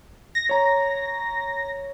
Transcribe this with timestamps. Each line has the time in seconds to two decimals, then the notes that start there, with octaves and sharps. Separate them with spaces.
0.35 A#6
0.49 C#5 A#5